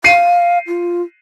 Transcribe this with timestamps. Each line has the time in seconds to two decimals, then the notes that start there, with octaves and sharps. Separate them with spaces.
0.04 F5 C7 D#7
0.67 F4